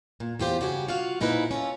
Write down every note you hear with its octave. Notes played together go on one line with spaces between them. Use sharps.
A#2
E2 F4 G4 C5
G2 C#3 F#4 G4 G#5
F4 F#4 F5
A#2 D#4 E4 G#4 B4 C5
C#4 F4 A4